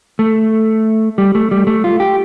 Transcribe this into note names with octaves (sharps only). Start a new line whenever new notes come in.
A3
G3
A3
G3
A3
F4
G4